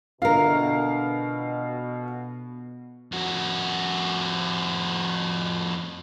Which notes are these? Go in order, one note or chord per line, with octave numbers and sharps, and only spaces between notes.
B2 D3 E3 F4 A#4 F5
F2 F#4